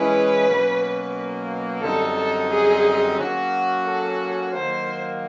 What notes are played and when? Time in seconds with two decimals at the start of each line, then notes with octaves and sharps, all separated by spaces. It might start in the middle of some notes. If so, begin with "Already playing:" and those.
Already playing: E3 G#3 C#4 E4 B4
0.47 B2 F#3 A#3 C#4
1.82 F#2 D3 G3 C4 D#4 A4
2.17 A4
2.50 G#4
3.17 F#3 A#3 C#4 F#4
3.86 A4
4.53 D#3 F#3 A#3 C5